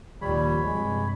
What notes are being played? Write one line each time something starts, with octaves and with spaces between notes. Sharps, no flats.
D#2 A#2 F3 G3 C#5 B5
G2 C3 G#3